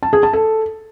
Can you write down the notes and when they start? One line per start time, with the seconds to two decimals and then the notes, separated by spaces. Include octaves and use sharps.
0.03 A5
0.13 G#4
0.23 A5
0.33 A4